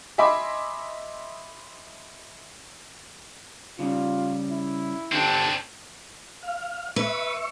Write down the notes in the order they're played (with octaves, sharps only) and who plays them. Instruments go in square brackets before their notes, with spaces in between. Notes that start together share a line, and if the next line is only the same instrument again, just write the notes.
[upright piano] D#5 E5 G#5 B5 C6 D6
[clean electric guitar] C#3 G3 [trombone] F4
[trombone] E4
[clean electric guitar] D3 G4 A4 [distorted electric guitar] C4 D4
[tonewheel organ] F5
[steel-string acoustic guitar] B4 [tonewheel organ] E5 C#6